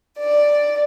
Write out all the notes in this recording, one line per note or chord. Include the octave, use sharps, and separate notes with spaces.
D5